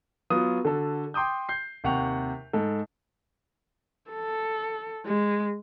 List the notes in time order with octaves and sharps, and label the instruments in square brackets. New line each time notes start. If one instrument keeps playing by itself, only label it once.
[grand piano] F#3 B3 F4 D#6
D3 F#4 A4
G5 C6 D6 D#6 G6
G6 C7
D#2 C3 F#5 G5 C#6 F7
G#2 A4
[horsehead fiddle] A4
G#3